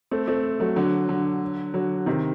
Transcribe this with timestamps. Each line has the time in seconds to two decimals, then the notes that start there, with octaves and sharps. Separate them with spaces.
0.11 A3 C4
0.28 A3 C4
0.60 F#3 A3
0.76 D3 F#3
1.09 D3 F#3
1.74 D3 F#3
2.06 C3 D#3